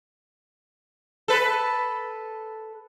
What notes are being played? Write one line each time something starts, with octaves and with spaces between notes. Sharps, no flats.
A4 B4